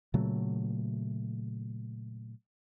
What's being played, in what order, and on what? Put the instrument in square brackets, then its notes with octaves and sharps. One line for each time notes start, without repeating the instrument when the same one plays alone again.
[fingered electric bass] A#2 C#3 F#3 A3